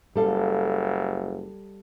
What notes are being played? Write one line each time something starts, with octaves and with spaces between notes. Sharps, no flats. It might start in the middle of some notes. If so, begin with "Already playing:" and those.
F#1 G3 A4 F5